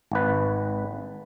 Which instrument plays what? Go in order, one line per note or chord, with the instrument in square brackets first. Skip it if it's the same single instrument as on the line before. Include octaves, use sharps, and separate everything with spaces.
[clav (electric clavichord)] G#1 B4